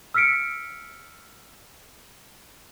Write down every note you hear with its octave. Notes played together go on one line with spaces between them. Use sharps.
E6 F6 B6 C#7 D7